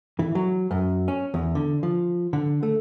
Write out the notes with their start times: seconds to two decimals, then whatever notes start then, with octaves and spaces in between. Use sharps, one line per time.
0.19 E3
0.35 F#3
0.71 F#2
1.08 C#4
1.34 E2
1.55 D3
1.83 F3
2.33 D3
2.63 A3